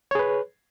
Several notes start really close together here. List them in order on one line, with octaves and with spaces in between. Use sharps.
C#5 G#4 B4